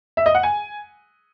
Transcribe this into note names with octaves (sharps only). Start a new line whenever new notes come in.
E5
D#5
F#5
G#5